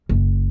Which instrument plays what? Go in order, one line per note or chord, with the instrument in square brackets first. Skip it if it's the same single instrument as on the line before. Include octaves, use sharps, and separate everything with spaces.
[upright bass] F#1